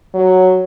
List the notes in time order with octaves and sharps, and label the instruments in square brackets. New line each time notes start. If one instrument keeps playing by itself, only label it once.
[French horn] F#3